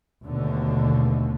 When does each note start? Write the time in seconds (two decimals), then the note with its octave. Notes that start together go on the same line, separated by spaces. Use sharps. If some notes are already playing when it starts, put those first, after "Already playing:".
0.25 D#2 B2 D3 A3